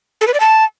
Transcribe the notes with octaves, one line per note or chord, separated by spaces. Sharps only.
A4
B4
D5
A5